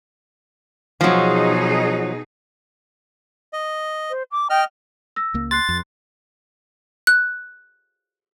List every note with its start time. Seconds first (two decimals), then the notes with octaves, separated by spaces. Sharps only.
1.01 B2 F3 F#3 D#4 G#4
3.53 D#5
4.10 C5
4.31 D6
4.50 D#5 G5 F6
5.16 E6 A#6
5.34 C#2 A#3
5.51 C6 F#6 A6 C7
5.69 F2
7.07 F#6